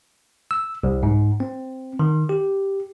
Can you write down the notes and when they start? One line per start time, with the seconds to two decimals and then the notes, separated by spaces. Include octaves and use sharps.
0.51 E6
0.83 C2
1.03 G#2
1.40 C4
1.99 D#3
2.29 G4